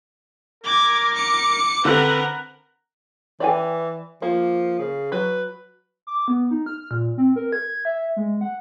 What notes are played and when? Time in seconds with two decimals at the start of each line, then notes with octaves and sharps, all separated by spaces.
0.64 A#4 D6 G#6
1.14 D6 C#7
1.85 D3 C4 A#4 B4 F#5 F#6
3.40 E3 D5 G5 G#5
4.22 F3 A#3
4.79 C#3
5.12 F#3 B4
6.07 D6
6.28 B3
6.51 D#4
6.66 F6
6.91 A#2
7.18 C4
7.36 A#4
7.53 G#6
7.85 E5
8.16 G#3
8.41 F#5